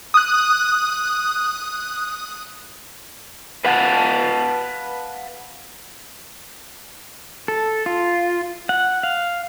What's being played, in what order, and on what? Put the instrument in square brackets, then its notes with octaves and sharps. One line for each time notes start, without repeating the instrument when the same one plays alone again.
[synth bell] D#6 F#6
[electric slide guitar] B4 F5 F#5 G#5 A5
[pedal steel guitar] A4
F4
F#5
F5